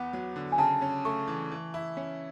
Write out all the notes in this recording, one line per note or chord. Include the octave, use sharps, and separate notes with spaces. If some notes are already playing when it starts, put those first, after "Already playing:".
Already playing: E2 B3 F#5
F#3
D3
G#5
C#3 A5
C#4
A3 C#6
E3
E3
E4
C#4